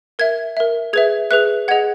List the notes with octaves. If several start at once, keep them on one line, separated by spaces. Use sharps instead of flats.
A#4 E5 G#6
A#4 E5
G#4 B4 E5 G#6
G#4 B4 E5 F#6
G#4 D#5 F#5 G#6